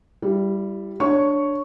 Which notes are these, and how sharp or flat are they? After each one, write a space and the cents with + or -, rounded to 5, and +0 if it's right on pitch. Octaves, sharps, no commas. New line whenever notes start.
G3 +0 E4 +30
D4 +0 C#5 +0 C#6 +5